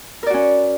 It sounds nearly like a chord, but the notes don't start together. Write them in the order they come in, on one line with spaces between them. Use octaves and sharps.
A#4 D5 F#4 C#4